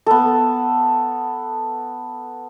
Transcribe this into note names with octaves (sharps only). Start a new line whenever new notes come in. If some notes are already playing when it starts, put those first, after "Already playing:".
B3 A4